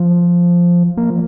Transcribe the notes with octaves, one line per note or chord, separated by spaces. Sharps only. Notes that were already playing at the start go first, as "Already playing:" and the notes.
Already playing: F3
A#3
F3